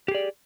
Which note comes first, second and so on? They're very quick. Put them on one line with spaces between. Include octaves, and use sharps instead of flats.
G4 G#4 D5